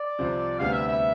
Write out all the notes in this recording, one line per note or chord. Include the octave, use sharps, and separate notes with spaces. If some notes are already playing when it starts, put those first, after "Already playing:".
Already playing: D5
C2 C3 F3 C4
D2 C3 G3 B3 D4 F5
E5
E5